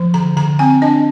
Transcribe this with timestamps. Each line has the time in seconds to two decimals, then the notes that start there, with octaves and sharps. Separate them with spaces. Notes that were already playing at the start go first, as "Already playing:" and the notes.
Already playing: F3
0.14 D3 A#5
0.37 D3 A#5
0.59 C4 G#5
0.82 D4 D#5